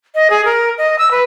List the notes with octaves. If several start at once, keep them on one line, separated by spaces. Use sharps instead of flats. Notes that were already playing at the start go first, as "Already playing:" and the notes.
D#5
G#4
A#4
D#5
E6
B4